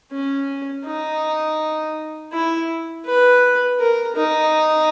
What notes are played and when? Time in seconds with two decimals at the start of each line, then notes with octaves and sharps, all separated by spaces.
0.12 C#4
0.86 D#4
2.33 E4
3.06 B4
3.80 A#4
4.17 D#4